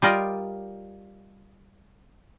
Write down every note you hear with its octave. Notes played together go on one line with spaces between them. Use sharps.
G3 F4 A#4 D5 D#5